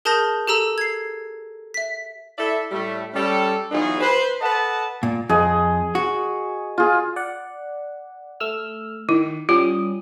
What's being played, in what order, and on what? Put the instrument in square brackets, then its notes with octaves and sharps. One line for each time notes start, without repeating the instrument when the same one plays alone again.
[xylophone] G#4 A#4 A5 D#6 G6 A#6
G4 A4 A#5 E6
G#6 C7
E5 B6
[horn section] E4 A4 D5 E5
A2 G3 A3
G3 C#4 A4
E3 F#3 B3 D#4 F4 G#4
B4 C5
A4 B4 D#5 F#5 A5
[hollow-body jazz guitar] A#2
[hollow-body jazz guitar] F2 [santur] G#4 D#5
[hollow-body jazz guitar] F#4
[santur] F4 G#4
[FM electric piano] D5 F#5
A3 E6 F6
[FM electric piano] D#3 [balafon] E4
[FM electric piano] G3 C#4 D#6 [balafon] F4